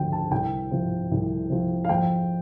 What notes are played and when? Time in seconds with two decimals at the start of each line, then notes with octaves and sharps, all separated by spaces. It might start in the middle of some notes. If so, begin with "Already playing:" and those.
Already playing: D2 D3 F3 G5
0.12 A5
0.31 C2 G5
0.71 C3 F3
1.11 C2
1.50 C3 F3
1.85 F5
1.89 F2 G5